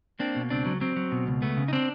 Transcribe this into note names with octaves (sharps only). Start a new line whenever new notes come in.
A#3 C4 D4
B2
C#2 C4 D4
F#3
F#3 C4
F#3
B2
C#2
A3 B3
C#3
D#4
C4 D4